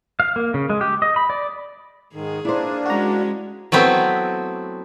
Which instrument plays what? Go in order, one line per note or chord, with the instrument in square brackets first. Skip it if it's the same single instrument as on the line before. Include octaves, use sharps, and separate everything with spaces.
[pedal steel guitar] F5
A#3
C#3
G#3
G4
D#5
B5
D5
[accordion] G#2 D#3 [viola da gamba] G#4
[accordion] A#3 D4 [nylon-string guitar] E4 C5
[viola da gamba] G#3 C#4 [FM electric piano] F#4 A#5
[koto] F#3 A3 B3 C4 E4